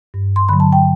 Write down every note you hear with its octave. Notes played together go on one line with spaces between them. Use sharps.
G2
C6
D3 F#3 B5
A5
G5